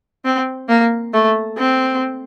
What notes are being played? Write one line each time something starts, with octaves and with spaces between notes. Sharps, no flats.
C4
A#3
A3
C4